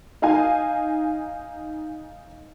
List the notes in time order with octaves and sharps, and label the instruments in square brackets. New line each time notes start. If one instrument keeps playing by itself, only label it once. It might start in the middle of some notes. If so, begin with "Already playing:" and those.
[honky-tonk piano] D#4 F5 G#5